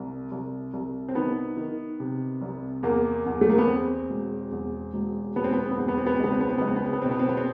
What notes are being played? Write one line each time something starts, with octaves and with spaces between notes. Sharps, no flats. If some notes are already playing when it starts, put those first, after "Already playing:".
Already playing: C2
C2
C2
C4
D#3 B3
D#3
C3
C2
E2 A#3
E2
A3
A#3
B3
E2 C4
E1
E2
E1
E1 B3
C4
B3
C4
B3
E2 C4
B3
C4
B3
C4
C#2 B3
C4
B3
C4
C#2 B3
C4
B3
C4
B3
B2 C4
B3
C4
B3
C4